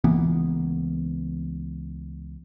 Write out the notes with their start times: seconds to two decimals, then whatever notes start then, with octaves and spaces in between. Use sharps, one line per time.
0.04 C#2 E3 A#3 B3